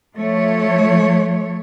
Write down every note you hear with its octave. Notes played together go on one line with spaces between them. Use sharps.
F3 A3 C#5